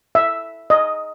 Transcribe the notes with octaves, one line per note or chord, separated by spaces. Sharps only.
E5
D#5